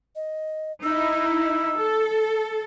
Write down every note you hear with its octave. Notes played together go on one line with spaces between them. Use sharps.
D#5
D#4 E4 E6
A4